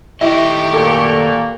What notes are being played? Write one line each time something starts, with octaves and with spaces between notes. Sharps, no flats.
D#3 A3 E4 G4 D#5 C#6
A#2 A#3 A4